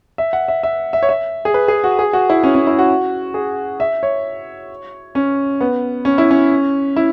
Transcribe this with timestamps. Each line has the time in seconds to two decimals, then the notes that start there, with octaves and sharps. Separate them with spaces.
0.18 E5
0.33 F#5
0.48 E5
0.63 E5
0.93 E5
1.03 C#5
1.09 E5
1.45 G#4
1.54 B4
1.68 G#4
1.84 F#4
1.99 G#4
2.13 F#4
2.30 E4
2.43 C#4
2.55 C#4
2.67 E4
2.79 F#4
3.34 G#4
3.80 E5
4.03 C#5
5.15 C#4
5.61 B3
6.05 C#4
6.18 E4
6.31 C#4
6.97 E4